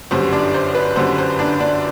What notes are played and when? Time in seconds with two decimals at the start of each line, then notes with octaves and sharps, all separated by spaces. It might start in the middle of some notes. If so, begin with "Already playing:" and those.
0.11 G1 F#2 D3 G3 C5
0.32 D4 D5
0.54 C5
0.75 B4
0.96 G1 F#2 D3 G3 C5
1.18 C5
1.39 D4 D5
1.60 D4 D5